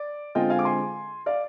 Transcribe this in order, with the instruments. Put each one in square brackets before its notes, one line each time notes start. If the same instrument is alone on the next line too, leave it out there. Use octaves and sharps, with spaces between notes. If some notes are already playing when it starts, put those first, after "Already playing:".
Already playing: [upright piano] D5
D3 G#3 C4 F4 D#5 G5
F5 G#5
D6
G#5 C6
D5 F5